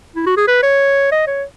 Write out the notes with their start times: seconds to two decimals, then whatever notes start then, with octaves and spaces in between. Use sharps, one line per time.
0.16 E4
0.27 F#4
0.37 G#4
0.48 B4
0.63 C#5
1.12 D#5
1.27 C#5